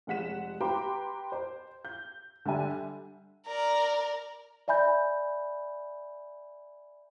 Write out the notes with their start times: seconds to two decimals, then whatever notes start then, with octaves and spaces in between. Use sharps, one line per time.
0.07 F1 G#3 F#5 B6 E7
0.61 G4 B4 G5 A#5 C6 D6
1.32 C5
1.85 G6
2.45 D3 G3 E5 G#5
3.47 A#4 D5 A#5
4.68 D5 E5 G#5 B5 G6